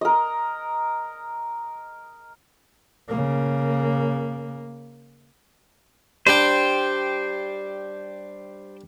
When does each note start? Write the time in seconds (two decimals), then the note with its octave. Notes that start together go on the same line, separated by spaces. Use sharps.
0.01 A#4 D#5
3.08 C#3 A#3
6.27 G3 D4 G4 C5 G5